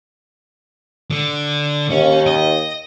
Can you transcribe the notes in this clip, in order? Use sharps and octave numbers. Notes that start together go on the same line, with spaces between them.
D3
D#2 C#4
D#5